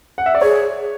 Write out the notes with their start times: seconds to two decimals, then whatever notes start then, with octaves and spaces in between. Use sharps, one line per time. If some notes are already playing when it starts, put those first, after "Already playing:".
0.18 F#5
0.26 E5
0.35 D5
0.41 G#4 C#5